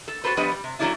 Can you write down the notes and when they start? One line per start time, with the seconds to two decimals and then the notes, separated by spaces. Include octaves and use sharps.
0.08 A4
0.24 F#4 G#4 A4 B4 C5
0.37 F3 G3 B3 D4 B4 D#5
0.51 G3
0.64 C3
0.79 F#3 A3 C#4 D4 E4 F4